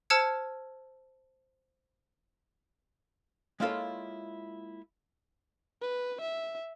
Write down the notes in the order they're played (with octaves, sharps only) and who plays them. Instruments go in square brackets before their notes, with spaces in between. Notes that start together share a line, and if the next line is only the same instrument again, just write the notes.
[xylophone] C5 A5 E6 F6 G#6 C#7
[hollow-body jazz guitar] G#3 A#3 E4 F4 A4 C#5
[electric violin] B4
E5